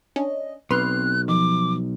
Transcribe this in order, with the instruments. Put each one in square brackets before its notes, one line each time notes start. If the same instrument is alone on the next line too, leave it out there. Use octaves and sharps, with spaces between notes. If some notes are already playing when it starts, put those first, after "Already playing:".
[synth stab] C#4 D4 [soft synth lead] D#5
[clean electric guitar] B1 [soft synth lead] C4 [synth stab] B4 C6 F6 [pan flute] F#6
[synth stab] D#3 [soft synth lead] F3 [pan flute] D6